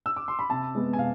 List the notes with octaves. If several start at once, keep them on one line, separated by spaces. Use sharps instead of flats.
E6
D6
C6
B5
C3 A5
G#3 B3
G#5
C3 F5